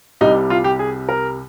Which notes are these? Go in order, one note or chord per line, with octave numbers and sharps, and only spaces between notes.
C2 C3 G3 D#4
F4
G4
G#4
A#4